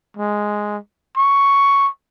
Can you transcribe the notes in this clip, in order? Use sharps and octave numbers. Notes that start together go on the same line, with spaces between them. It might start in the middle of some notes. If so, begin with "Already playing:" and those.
G#3
C#6